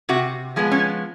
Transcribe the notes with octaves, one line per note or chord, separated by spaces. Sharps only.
C3 F#4
F3 G#3 B3
C#4